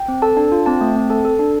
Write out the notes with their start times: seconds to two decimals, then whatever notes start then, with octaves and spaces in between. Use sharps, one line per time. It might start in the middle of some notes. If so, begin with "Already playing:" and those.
Already playing: G5
0.08 C4
0.22 A4 A5
0.37 D4
0.52 F4
0.66 C4 A5
0.81 A3
0.96 C4
1.10 A4 A5
1.25 A4
1.39 D4